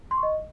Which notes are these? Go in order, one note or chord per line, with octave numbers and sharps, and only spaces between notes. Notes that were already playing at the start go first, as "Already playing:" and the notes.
C6
C#6
D#5